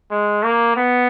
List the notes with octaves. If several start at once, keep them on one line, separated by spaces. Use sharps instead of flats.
G#3
A#3
B3